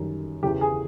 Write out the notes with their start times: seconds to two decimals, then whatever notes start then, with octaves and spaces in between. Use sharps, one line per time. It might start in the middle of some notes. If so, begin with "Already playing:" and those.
Already playing: F#2 D#3 G3
0.43 E2 C#3 E3 G4
0.61 G#4